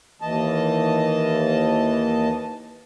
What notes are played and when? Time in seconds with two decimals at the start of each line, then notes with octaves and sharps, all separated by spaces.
0.21 D#2 E3 D#5 A5